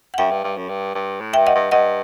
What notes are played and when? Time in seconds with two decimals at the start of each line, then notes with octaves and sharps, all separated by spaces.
0.14 F#5
0.18 F#2 E5 G5
0.31 G2
0.44 G2
0.57 F#2
0.69 G2
0.95 G2
1.21 A2
1.33 G2 E5 G5
1.47 D#5 F#5
1.55 G2
1.71 G2 D#5 F#5